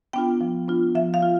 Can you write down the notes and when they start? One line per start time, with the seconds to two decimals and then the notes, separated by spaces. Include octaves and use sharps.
0.13 B3 D4 F4 G5
0.41 F3
0.68 B3 D4 F4
0.95 F3 E5
1.14 F5
1.22 F4